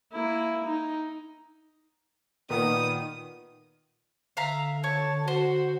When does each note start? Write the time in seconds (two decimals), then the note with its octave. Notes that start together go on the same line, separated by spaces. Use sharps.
0.13 A#3 E4
0.64 D#4
2.50 A#2 D#3 B3 D#6
4.37 D3 E5 F5 A#5
4.84 C#5 A5
5.28 F#4 C5